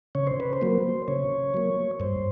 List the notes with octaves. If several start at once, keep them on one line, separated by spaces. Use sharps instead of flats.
C#3 C#5
C5
B4
C5
F#3 A#3
C#3 C#5
F#3 A#3
G2 C5